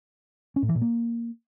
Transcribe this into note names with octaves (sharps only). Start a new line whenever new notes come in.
C#4
A2
E3
A#2
A#3